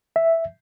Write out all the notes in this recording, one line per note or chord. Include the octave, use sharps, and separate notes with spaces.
E5